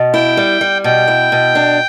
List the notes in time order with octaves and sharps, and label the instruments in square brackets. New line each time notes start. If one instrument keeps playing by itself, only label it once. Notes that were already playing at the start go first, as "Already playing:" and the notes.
Already playing: [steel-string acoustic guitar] B2
[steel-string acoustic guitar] E4 [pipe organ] G5
[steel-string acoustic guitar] G3
G3
[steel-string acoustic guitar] B2 [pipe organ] G5
[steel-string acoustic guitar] E4
B2
D4